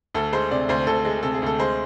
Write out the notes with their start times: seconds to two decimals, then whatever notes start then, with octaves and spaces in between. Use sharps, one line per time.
0.14 D2 A4
0.33 G#3 C5
0.51 C3 D5
0.69 D2 C5
0.87 D2 A4
1.05 G#3
1.23 C3 A4
1.34 G#4
1.42 D2 A4
1.59 G#3 C5